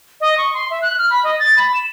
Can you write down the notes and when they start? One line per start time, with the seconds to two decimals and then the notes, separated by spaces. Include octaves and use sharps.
0.21 D#5
0.38 C#6
0.54 C6
0.70 E5
0.82 F#6
0.99 F6
1.10 B5
1.24 D#5
1.40 A6
1.57 B5
1.74 E7